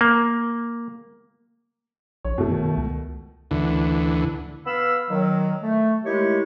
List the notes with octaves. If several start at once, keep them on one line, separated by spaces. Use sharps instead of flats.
A#3
A#1 C#5
F#2 B2 A3
D#3
C#2
D2 D3 E3
B3 F5 B5 E6
D#3 F#3
A3
D#3 G#3 A3 E4 G4 C#5